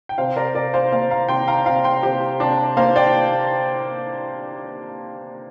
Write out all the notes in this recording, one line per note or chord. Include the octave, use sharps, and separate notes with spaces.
G5
C3 C5 F5
A#4 D5
C3 A#4 D5
C5 F5
A#3 C5 F5
F5 A#5
C3 G5 C6
F5 A#5
C3 F5 A#5
G5 C6
C3 G4 C5
C3 D4
A#3 C5 F5
D5 G5